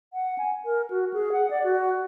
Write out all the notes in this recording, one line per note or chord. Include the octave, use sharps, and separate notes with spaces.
F#5
G#5
A#4
F#4
G#4
F#5
D5
F#4